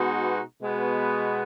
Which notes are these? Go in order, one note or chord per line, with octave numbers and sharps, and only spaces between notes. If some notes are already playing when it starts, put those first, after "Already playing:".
Already playing: B2 G#3 B3 D#4 F#4
B2 G#3 B3